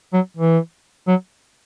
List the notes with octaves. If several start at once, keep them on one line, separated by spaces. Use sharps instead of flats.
F#3
E3
F#3